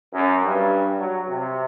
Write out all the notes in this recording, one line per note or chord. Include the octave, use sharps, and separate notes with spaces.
F#2
G2
F#3
C3